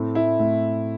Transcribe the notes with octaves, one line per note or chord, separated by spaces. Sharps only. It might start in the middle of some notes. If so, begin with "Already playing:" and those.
Already playing: A2 A3 C4
E4
A2 A3 C4